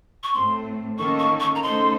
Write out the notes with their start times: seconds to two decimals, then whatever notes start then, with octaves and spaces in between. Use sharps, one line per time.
0.23 C#6
0.33 A2 A3 C4 C6
0.98 D#3 A#3 C#4 A4 C#6
1.19 C#6
1.40 C#6
1.55 A#5
1.63 C#3 A3 D#4 A4 C5 C6